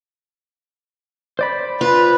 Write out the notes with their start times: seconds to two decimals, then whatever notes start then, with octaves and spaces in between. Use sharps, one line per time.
1.39 C5 D5 B5
1.81 F4 B4